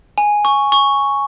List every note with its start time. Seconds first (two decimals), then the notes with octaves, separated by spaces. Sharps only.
0.18 G#5
0.45 C#6
0.72 C#6